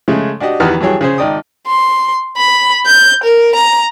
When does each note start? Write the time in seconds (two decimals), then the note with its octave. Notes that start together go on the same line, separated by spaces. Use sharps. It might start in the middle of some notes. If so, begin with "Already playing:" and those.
0.08 C#3 G#3 A3
0.40 D4 F#4 G4 D#5
0.60 E2 D#3 G4 B4 F#5 F6
0.81 G2 E3 F#3 G#4 C#5 G5
1.01 C#3 G#4 C5
1.18 G#1 D#4 D5 G5 D#6
1.67 C6
2.37 B5
2.87 G6
3.24 A#4
3.55 A#5